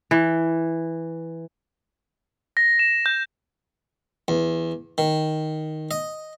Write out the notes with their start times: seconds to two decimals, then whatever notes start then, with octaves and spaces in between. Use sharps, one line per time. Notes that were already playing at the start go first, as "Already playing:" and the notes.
0.11 E3
2.57 A#6
2.79 E7
3.06 G6
4.28 E2
4.98 D#3
5.91 D#5